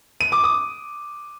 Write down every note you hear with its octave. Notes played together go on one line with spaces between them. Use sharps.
D#7
D6
D#6